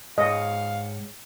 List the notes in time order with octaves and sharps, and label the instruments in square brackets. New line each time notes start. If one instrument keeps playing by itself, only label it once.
[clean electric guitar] G#2 G#4 C#5 [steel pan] D#5 [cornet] F5